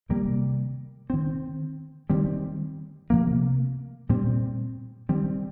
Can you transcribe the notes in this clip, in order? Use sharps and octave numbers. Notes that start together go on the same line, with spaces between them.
C3 D#3 G3 A#3
D#3 C4
D#3 G3 C4
C3 F3 A#3
A#2 G3 C4
D#3 G3 C4